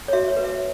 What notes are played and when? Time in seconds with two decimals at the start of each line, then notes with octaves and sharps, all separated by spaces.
0.08 C#5
0.13 F#4 E5
0.28 C#5
0.36 B4
0.44 E5